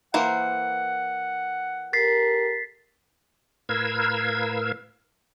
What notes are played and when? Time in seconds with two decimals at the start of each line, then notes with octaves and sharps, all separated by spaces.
0.14 E3 A#3 C5 F#5
1.93 G4 A4 A#4 A6 B6 C7
3.69 A2 A#4 B4 F5 E6 G#6